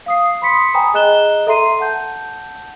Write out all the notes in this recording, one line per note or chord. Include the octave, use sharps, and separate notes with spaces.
F5 D#6 C7
B5 C6 D#6 B6 C#7
G5 G#5 A#5 B5 D#6
G#4 D#5 A#5 F#6 E7 G7
A4 E5 A#5 C6 C7 D#7
F#5 A5 G6